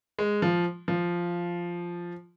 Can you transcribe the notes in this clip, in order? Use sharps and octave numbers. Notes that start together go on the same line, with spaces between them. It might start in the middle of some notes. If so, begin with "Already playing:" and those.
G#3
F3
F3